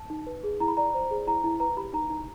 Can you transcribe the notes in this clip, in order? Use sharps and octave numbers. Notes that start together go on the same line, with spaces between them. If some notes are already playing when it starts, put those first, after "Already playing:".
Already playing: A5
D#4
B4
G#4
E4 A#5
B5
D5 A#5
C5
G#4
E4 A#5
E4
B4 A#5
G4 B5
D#4 A#5
D#4